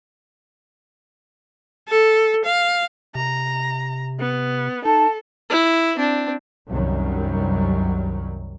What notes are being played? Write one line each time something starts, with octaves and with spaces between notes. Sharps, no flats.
A4
F5
C3 A#5
B3
D#4 A4 A5
E4
C4 D4
C2 F#2 D#3 F#3 G3